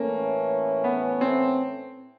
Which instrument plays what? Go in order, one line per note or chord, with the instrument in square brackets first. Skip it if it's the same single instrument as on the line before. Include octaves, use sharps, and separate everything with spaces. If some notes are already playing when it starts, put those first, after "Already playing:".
Already playing: [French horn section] A2 E3 A3 C#4 [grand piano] A#3
[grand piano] B3
C4